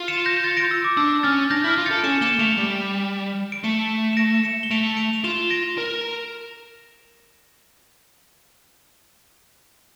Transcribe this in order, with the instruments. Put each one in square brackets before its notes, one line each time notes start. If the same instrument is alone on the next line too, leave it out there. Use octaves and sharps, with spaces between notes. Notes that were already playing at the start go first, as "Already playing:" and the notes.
Already playing: [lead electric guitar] F4
[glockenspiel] C#7 E7
G6 A#6
A6 C#7
A#6 D7
E6
D6
[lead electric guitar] D4 [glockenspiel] E6
[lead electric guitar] C#4 [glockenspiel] F6 A6
[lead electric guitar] D4 [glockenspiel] G6 A#6
[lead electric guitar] E4 [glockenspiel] F6
[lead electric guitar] F4
[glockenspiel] A6 C#7
[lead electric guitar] A4
[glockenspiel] D7
[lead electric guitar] C#4 [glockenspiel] C#7 E7
[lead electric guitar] A#3 [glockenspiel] E7 G7
[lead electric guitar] A3 [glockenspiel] D7 F7
[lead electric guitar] G3
[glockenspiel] D7
[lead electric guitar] A3 [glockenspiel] C#7 E7
[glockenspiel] E7
A#6 D7
C#7 E7
G7
[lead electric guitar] A3 [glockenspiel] D7 F7
[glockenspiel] D7 F7
F7
[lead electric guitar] F4 [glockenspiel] E7 G7
[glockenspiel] A#6 D7
[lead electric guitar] A#4